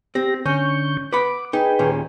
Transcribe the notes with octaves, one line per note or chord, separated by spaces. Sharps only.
C4 G4 A#6
D3 C#4 C#6 G6
B4 F#5 B5 D6
D#4 G#4 B4 G5
D#2 A#2 C#4